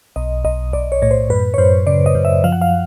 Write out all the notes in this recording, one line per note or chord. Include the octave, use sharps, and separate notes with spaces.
B1 D#5
B1 D#5
B1 D5
C#5
A2 C#5
C5
F#2 B4
C#5
F#2 C5
C#3 D5
D#5
F#2
E5
F3 F5
F#5
F5